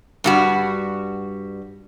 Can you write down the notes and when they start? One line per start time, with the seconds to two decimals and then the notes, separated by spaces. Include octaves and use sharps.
0.24 G2 G3 F#4